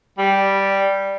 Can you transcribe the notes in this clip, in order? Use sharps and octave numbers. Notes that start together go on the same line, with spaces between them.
G3